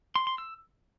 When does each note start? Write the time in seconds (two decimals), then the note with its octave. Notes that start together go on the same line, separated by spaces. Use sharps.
0.16 C6
0.27 C6
0.38 E6